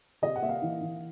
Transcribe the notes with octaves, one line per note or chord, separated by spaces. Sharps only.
C3 D#5
F#5
A#3 E5
F5
E3
E3